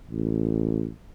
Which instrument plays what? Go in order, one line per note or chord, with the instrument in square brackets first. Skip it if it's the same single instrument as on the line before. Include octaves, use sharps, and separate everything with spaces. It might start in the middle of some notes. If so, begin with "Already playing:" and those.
[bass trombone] A1